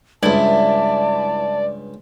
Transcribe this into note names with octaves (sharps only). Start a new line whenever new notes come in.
C#2 G2 E4 D5 A5